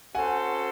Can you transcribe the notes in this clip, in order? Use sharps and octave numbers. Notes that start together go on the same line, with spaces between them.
C#4 F#4 A4 C5 F#5 G#5